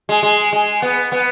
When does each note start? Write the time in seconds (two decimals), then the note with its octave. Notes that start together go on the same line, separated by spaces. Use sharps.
0.09 G#3
0.23 G#3
0.53 G#3
0.82 B3
1.12 B3